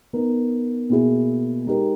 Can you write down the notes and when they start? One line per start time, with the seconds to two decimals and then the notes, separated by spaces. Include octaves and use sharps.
0.13 B3 D#4 A#4
0.90 B2 A#3 E4 G#4
1.66 G#3 D#4 G4 A#4